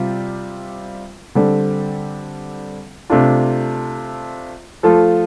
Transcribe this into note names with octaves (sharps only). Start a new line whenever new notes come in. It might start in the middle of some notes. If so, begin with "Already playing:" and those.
Already playing: C3 G3 F4
D3 G3 C4 A4
C3 A3 D4 F4
F3 A3 F4 A4